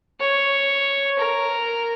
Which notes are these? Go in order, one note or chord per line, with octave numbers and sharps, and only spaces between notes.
C#5
A#4